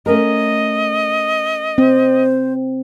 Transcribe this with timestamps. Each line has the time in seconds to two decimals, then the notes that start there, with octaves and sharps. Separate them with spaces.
0.06 A3 C#4 A#4 D#5
1.78 C4 C5